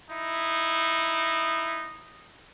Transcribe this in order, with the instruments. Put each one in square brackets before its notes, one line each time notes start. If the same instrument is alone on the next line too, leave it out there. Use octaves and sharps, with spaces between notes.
[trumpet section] D#4 E4